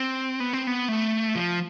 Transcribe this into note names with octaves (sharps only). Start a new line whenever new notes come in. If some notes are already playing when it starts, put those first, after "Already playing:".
Already playing: C4
B3
C4
B3
A3
F3